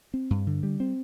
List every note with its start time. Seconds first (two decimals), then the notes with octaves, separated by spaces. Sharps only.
0.14 C4
0.30 G2
0.47 D3
0.63 G3
0.80 C4